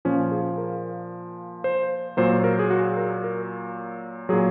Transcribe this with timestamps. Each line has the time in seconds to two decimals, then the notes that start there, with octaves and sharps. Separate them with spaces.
0.05 A#2 F3 C#4
0.31 G#4
0.58 A#4
1.64 C5
2.17 A#2 F#3 C5
2.44 A#4
2.59 G#4
2.70 F#4
2.97 A#4
3.24 A#4
4.29 A#2 F#3 G#4